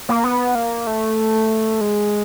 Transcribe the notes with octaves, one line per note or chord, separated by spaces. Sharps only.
A#3
B3
A#3
A3
G#3